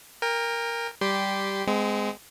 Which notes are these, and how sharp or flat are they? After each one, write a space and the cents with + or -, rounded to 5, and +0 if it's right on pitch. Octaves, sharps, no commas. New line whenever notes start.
A#4 +0 G5 +40
G3 -5 G4 +0 C6 -25
G#3 +0 C4 -35